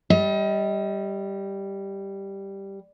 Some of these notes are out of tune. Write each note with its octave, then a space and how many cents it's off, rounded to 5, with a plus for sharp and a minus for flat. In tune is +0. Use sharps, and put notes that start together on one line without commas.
G3 +0 D#5 +30